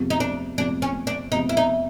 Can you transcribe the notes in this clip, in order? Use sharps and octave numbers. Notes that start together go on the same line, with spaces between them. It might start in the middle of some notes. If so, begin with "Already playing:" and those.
Already playing: F2 C3 F3 G#3 B3
D#4
D4
F2 C3 F3 G#3 B3 D4
C#4
D4
F2 C3 F3 G#3 B3 D#4
E4
D#4